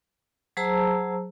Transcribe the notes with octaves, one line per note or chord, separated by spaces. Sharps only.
F#3 G#4 C5 A5 A#5 E6